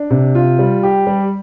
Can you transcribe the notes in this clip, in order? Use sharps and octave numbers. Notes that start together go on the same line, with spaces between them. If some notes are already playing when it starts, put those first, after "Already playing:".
Already playing: D4
C3
F4
G3
G4
G3